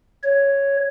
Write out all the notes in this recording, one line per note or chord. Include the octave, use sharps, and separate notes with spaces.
C#5